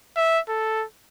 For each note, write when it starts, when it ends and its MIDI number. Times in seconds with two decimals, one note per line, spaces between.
0.17 0.40 76
0.49 0.85 69